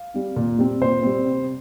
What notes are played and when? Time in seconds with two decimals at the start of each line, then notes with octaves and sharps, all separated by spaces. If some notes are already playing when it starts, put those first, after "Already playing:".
Already playing: F5
0.14 G3 C4
0.36 A#2
0.58 G3 C4
0.81 A#2 C5
1.03 G3 C4
1.26 C3